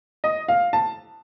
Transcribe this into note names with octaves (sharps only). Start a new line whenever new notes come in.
D#5
F5
A5